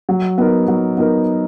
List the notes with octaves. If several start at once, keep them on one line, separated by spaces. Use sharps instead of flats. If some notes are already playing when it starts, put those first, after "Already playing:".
F#3
B3 D#4 A#4
F#3
B3 D#4 A#4